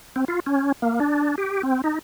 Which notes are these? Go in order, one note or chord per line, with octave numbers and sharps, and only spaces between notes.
C4
F4
C#4
A#3
D4
G4
C4
D#4